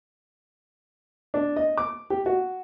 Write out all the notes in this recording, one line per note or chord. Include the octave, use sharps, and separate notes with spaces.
D4
D#5
D6
G4
F#4